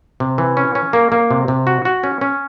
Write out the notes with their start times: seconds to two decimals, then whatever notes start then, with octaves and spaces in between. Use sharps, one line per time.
0.20 C3
0.38 E3
0.57 C#4
0.75 C#4
0.93 A#3
1.12 A#3
1.31 C3
1.48 C3
1.67 F#4
1.85 F#4
2.04 C#4
2.21 C#4